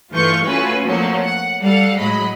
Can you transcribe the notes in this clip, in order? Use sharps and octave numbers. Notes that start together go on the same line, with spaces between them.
G2 E3 A3 F4 C#6 G6
A3 C#4 F4 F#4 B4 G#5
F2 A#2 F3 F#3 A3
F#5
G3 A4 F5 F#5
A2 F#3 G#3 D#5 B5